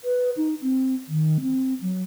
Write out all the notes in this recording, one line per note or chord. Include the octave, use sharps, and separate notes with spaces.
B4
D#4
C4
D#3
C4
F#3